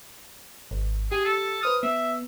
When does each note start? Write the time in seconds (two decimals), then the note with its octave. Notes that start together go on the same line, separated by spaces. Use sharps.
0.71 G#1
1.12 G4 G#4
1.25 A4
1.63 B4 C5 D#6 F6
1.83 B3 E5